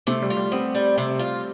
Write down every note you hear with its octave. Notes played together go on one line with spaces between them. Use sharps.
C3 A3
G3
F4
G3
B3 C4
G3
C3
F4